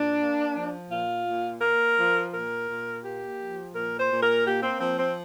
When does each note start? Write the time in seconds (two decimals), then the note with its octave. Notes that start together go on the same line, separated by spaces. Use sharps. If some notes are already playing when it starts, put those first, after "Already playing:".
Already playing: A#2 D4
0.19 A#3
0.55 F3
0.90 A#2 F4
1.26 A#2
1.61 A#3 A#4
1.96 F3
2.32 A#2 A#4
2.67 A#2
3.03 A#3 G4
3.39 F3
3.74 A#2 A#4
3.98 C5
4.10 A#2
4.22 A#4
4.45 A#3 G4
4.62 C4
4.80 F3 C4
4.98 C4